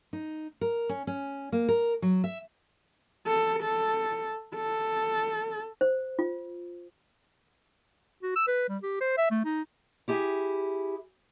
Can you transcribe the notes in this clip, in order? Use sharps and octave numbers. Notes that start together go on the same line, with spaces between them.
D#4
A#4
C#4
C#4
A#3
A#4
F#3
E5
A4
A4
A4
C5
F4
F#4
E6
B4
G3
G4
C5
E5
A3
D#4
E4 G4 G#4